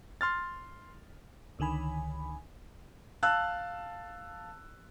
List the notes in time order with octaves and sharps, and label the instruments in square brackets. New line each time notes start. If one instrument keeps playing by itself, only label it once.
[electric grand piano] C6 F6 A6
[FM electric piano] C#2 D3 D#3 G#5 B5
[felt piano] F5 A5 E6 F#6